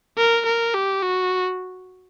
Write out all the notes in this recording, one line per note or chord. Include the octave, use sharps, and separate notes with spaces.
A#4
A#4
G4
F#4